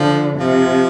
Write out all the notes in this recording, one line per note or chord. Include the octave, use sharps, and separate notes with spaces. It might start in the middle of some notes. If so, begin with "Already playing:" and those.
Already playing: D3 F3
C3 F3